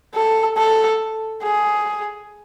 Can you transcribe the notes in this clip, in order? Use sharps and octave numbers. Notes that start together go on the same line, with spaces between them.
A4
A4
G#4